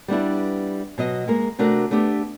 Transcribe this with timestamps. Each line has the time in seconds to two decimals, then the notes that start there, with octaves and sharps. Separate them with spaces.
0.08 G3 B3 D4 E4
0.98 B2 F#3 D#5
1.27 G#3 A#3 A#4
1.59 C3 A3 D4 F#4 A#4
1.91 A3 B3 D4 G4